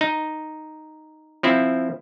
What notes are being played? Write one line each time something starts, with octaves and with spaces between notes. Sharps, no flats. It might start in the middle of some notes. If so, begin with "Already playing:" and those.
D#4
F3 C4 E4